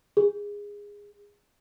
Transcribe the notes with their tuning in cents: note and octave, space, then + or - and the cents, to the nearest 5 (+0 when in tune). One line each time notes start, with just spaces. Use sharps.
G#4 -20